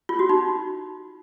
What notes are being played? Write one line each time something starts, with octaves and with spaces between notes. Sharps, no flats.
F4
F#4
D#4